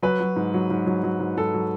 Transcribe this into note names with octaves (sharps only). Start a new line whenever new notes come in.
F#3 B4
F#3
G#2
F#3
G#2
F#3
F#3
G#2
G#2 A4
F#3